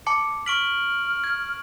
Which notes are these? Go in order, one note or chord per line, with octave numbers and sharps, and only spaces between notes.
A5 D6 C#7
C#6 F6 B6 D7 F#7
G#6